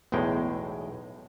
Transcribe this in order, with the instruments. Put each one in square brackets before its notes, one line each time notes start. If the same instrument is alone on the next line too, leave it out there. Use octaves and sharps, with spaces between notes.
[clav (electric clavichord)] B1 E2 A2 G#3 G5